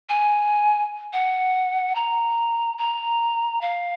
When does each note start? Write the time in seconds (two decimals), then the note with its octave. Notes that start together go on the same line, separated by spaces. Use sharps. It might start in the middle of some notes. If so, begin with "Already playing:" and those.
0.09 G#5
1.13 F#5
1.95 A#5
2.78 A#5
3.61 F5